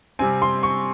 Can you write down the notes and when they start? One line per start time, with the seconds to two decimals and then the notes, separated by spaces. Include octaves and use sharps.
0.19 C3 G3 C4 G#5
0.42 C6
0.63 C#6